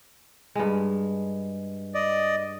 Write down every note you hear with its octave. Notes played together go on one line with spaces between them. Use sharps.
G2 G#3
D5 D#5